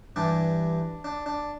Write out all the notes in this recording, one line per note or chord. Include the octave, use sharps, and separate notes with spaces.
G2 E3 G3 D4
D4
D4